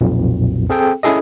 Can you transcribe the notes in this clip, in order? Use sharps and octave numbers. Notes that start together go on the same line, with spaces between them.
B1 F2 A#2
C4 G#4 A4 G5
C#4 E4 G#4 A4 D#5